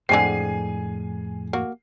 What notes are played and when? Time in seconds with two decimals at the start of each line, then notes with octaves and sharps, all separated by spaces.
0.09 F2 A2 D3 G#3 C4 G#4 G#5 C7
1.53 A#3 F#4